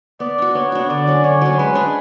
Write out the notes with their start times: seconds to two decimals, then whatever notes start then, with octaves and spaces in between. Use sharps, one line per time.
0.20 B3 D5
0.38 D4 F#4
0.55 B3 C#5
0.72 D4 F#4
0.89 D3 D5
1.07 F#3 C#4
1.24 D3 C#5
1.41 F#3 C#4
1.58 G#3 B4
1.75 D4 G#4